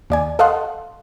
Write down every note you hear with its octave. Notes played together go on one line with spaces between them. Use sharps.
D#2 D5 G#5
A4 D#5 F5 F#5 C6